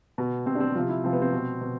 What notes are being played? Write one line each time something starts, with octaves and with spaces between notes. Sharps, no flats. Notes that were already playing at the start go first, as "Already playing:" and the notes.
B2
B2 C4
D4
C4
C3 F3 F4
E4
C3 F3 C4
B3
C4
B2
B2